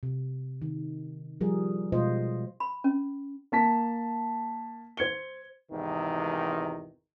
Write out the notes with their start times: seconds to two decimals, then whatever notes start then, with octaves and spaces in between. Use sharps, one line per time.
0.03 C3
0.62 D#3
1.41 F3 G3 G#4 A#4
1.92 B2 G#3 F4 C5 D#5
2.60 B5
2.84 C#4
3.52 A#3 A5 B6
4.97 C5 G#6 C#7 G7
5.72 G#1 E2 C3 D#3 E3